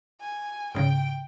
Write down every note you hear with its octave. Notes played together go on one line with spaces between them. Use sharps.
G#5
G#2 C#3 G5